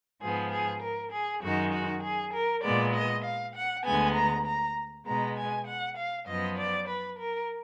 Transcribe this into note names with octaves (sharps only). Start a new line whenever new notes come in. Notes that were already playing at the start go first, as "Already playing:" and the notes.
G#2 F3 B3 G#4
G#4
A#4
G#4
F#2 D#3 G#3 F#4
F#4
G#4
A#4
A#2 G#3 B3 D5
D#5
F5
F#5
D2 D3 G#3 B3 G#5
A#5
A#5
B2 G#3 B3 A#5
G#5
F#5
F5
F#2 F3 B3 D#5
D5
B4
A#4